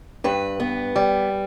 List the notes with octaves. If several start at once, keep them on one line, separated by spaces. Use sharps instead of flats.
G2 B4
B3
G3